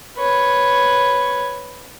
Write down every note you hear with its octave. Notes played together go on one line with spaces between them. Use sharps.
B4 C#5